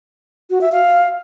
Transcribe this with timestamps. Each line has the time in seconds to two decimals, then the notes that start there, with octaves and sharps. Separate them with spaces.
0.50 F#4
0.61 E5
0.72 F5